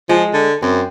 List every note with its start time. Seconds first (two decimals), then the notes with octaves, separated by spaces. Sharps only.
0.09 F3 G#3
0.33 D3
0.62 F#2 C4